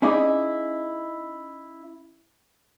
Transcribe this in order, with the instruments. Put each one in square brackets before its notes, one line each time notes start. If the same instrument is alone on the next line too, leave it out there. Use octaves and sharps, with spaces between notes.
[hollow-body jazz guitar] C#4 D#4 E4 G#4 D5 D#5